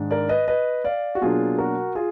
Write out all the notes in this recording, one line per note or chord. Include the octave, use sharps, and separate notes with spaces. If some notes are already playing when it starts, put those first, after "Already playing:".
Already playing: G#2 D#3 G#3 D4
A#4 D5
B4 D#5
B4 D#5
D5 F5
F#4
B2 F#3 A#3 D4 F4 G#4
F#4 A#4
F4 G#4